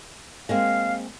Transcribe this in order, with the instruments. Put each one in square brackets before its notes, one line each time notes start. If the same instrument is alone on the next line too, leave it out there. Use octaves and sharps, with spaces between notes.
[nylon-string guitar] G#3 A#3 C4 [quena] F5